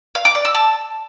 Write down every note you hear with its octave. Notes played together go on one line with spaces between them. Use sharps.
F5
D6
D5
E6
A5